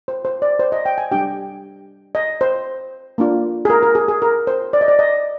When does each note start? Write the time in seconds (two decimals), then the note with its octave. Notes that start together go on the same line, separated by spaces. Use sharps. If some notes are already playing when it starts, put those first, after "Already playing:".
0.08 C5
0.25 C5
0.42 D5
0.60 C5
0.72 D#5
0.86 G5
0.98 G#5
1.11 G3 D4 G4 G5
2.15 D#5
2.41 C5
3.18 A#3 D4 F4
3.65 G#4
3.70 A#4
3.83 A#4
3.95 G#4
4.08 G#4
4.22 A#4
4.47 C5
4.73 D5
4.81 D#5
4.88 D5
4.99 D#5